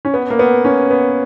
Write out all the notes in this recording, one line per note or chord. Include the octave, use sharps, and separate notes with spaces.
C#4
B3
A#3
B3
C#4
B3